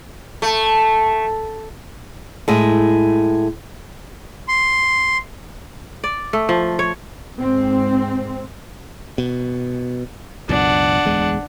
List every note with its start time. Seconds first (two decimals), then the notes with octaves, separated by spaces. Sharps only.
0.42 A3
2.48 A2 G#3
4.48 C6
6.04 D5
6.33 A3
6.49 F3
6.79 C#5
7.38 G#2 C4
9.18 B2
10.49 C#2 F#2 B2 D4 F#5
11.05 D1 E2 G#3